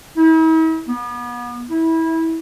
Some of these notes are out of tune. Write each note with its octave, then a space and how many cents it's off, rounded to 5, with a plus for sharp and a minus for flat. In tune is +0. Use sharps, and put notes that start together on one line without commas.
E4 -45
B3 -35
E4 -20